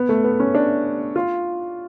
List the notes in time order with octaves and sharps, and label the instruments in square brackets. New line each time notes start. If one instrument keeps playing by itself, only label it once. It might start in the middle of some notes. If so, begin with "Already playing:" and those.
Already playing: [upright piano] B3
A3
B3
C#4
D4
F4